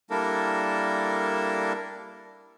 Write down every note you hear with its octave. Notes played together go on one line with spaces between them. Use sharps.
G3 A#3 D4 E4 A4 A#4